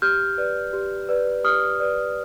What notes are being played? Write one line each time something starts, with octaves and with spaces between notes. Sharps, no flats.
G4 F6 G6
B4 D5
G4
B4 D5
G4 D#6 F6
B4 D5